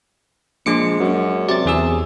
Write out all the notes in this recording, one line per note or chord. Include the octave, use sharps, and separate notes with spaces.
A#1 G#3 D6 C#7
F#2
C3 D5 A6
E2 G#4 E6